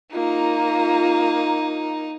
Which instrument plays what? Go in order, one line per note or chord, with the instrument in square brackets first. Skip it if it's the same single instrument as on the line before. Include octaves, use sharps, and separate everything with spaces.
[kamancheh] A#3 A#5 [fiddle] D#4 [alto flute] F4